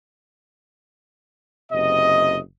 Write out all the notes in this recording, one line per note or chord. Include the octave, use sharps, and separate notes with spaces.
F#1 C3 D#5